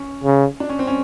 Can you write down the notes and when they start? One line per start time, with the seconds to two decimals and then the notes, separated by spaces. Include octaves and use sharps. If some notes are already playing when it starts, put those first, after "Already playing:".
Already playing: C#4
0.24 C#3
0.60 D4
0.69 C#4
0.79 C4
0.87 C#4